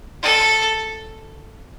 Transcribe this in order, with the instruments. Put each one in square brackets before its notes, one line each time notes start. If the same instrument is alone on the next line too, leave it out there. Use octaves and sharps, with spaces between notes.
[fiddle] A4